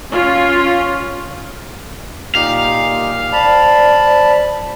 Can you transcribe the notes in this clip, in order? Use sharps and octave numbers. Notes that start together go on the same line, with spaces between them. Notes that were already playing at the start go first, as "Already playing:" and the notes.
C#4 F4
A#2 D#4 G4 F5
C5 D5 A5 B5